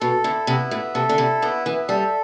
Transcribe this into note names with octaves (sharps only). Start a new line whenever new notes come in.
B2 A4
D3 E4
C3 B3
A2 E5
C3 A4
D3
C3 E4
D3 B3
E3 E5
G3 A4